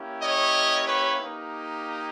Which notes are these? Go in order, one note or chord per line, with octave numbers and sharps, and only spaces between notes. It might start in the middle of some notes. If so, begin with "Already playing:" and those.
Already playing: A#3 C#4 E4 G4
C#5 D#5
B4 C#5
A#3 D#4 G4